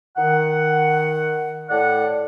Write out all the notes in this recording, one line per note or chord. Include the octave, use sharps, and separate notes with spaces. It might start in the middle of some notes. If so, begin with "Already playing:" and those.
D#3 F#5
A2 D5 F#5